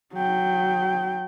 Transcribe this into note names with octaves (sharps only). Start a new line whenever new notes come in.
F#3 G5